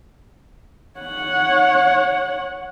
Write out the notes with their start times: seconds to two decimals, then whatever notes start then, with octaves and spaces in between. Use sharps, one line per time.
1.00 C#5 F#5